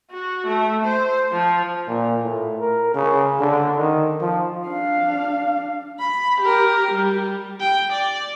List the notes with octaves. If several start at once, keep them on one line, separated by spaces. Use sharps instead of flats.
F#4
A3
C5
F3
A#2
A2
A#4
C#3
D3
D#3
F3
D4 F5
B5
G4 A#4
G3
G5
D5